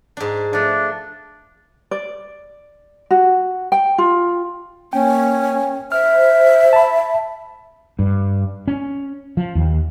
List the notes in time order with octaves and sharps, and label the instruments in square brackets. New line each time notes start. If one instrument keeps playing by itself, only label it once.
[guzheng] G#2 D4
[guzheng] F3 A3 [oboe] D4
[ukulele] D5
F#4
G5
F4
[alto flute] A#3 [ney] C#4 [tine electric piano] G5
[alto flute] C5 [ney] E5 [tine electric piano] F6
[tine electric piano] A5 B5
[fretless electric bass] G2
C#4
F3
D#2